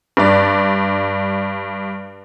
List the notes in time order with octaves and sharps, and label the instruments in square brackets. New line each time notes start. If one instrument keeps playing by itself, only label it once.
[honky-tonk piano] G2 D5